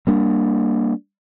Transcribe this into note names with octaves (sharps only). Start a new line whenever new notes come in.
G3 A#3 D4